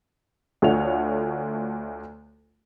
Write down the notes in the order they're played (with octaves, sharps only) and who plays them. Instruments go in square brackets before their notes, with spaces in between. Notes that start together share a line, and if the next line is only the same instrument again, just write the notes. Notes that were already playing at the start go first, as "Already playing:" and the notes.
[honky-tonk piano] D2 A3 F4 C#5 F#5 F7